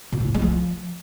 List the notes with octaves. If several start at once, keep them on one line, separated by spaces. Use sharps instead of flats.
A#2
A2
E2
G#3
F3